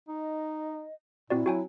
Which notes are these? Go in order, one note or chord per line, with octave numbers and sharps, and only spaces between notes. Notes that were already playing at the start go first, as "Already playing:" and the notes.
D#4 D#5
A#2 C4 E4 F#4 D5
F#3 F#4 G5 G#5